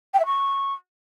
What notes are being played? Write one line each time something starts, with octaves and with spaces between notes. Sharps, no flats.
G5
E5
C#6